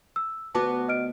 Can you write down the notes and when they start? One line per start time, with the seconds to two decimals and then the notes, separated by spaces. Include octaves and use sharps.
0.16 E6
0.55 D2 B3 F#4 A5 D6
0.88 D#5 F6 D7